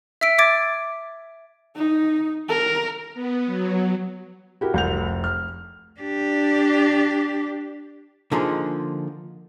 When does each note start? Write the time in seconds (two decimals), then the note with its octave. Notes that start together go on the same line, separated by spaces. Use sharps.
0.21 E5 E6 B6 D7
0.38 E5 D6 G#6 A6 D7
1.76 D#4
2.49 A#4
3.14 B3
3.46 F#3
4.61 E4 F#4 G4 A#4
4.74 F1 C2 G6 F7
5.24 F6
6.01 D4 G4
8.32 D3 F3 A#3 D#4 G#4